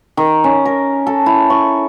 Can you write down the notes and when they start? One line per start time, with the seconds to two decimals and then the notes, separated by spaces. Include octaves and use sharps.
0.17 D#3
0.44 C#4
0.65 A#4
1.07 A4
1.26 E4
1.50 C#6